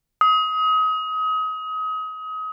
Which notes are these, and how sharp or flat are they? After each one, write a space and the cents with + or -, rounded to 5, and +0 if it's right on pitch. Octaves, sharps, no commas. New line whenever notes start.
D#6 +30